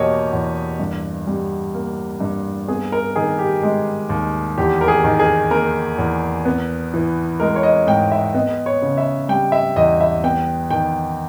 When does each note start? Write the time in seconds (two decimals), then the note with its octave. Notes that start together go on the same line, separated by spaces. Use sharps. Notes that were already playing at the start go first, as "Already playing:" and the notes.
Already playing: E2 B2 A#3 G4 C#5 D#5
0.33 E2
0.80 G2
1.27 G3
1.74 A#3
2.21 G2
2.68 B3 G#4
2.92 A#4
3.16 D#3 G#4
3.39 G4
3.63 G#3
4.09 D#2
4.58 E2 G4
4.81 A#4
4.88 G#4
5.04 D#3
5.19 G#4
5.51 A#3 A#4
5.98 E2
6.45 B3
6.94 E3
7.40 G#3 A#4
7.56 C#5
7.63 D#5
7.87 G#2 G5
8.12 E5
8.34 B3 D#5
8.66 C#5
8.82 C#3
8.98 E5
9.29 G3 G5
9.52 E5
9.76 E2 D#5
10.00 E5
10.23 B3 G5
10.70 D#3 G5